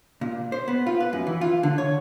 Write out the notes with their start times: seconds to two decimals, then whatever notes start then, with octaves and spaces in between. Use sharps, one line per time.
0.21 A#2
0.52 C5
0.68 B3
0.87 F4
1.00 B4
1.13 F#2
1.27 E3
1.41 F4
1.63 D3
1.78 C#5